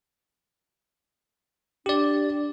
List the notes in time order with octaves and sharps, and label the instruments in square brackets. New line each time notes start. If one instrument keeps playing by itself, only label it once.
[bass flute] D4 [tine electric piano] G4 D5